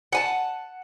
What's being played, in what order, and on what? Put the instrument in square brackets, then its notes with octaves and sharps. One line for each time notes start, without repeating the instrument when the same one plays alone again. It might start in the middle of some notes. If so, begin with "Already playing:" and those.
[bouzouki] F#5 G#5 A5